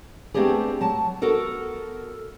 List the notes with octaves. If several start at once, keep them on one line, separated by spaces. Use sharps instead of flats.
A3 B3 C4 D4 G4 G#4
F#3 A5
B3 F#4 A4 A#4